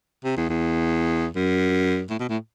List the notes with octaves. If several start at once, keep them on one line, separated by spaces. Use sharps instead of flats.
C3
E2
E2
F#2
A2
B2
A2